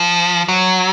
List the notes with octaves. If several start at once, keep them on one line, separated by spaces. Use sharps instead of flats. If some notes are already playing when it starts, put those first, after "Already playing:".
Already playing: F3
F#3